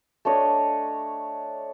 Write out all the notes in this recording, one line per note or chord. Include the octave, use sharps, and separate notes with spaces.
A3 D4 C#5 D#5